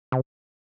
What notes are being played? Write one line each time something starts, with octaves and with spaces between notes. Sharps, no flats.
C3